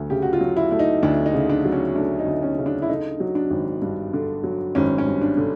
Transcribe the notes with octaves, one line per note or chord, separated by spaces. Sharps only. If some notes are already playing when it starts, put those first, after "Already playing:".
Already playing: D2 F#3 A3
C#3 G4
F#4
F4
F#3
E4
A3 E4
D#4
D2 D4
D#4
C#3
D4
F#3
C#4
A3 D4
D#4
D2
C#4
C#3
D4
E4
D3 D#4
F#3
D4
G#1
G2
D3
F#3
G#1 C#4
C#4
G2
D4
D3